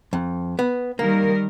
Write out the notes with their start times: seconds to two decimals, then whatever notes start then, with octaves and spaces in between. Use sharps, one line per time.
0.13 F2
0.59 B3
0.99 D#3 G3 A#3 A#4